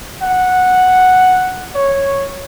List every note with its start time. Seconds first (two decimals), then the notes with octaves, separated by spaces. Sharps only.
0.22 F#5
1.75 C#5